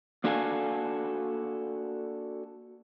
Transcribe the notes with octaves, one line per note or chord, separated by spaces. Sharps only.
A#3 D4 F#4 A4 F5 G#5